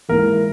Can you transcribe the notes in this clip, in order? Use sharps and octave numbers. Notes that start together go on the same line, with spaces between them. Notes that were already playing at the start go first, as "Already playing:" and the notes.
G#2 E3 A#3 A#4